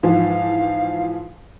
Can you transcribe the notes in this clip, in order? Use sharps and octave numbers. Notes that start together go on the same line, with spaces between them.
G#2 E3 F3 F5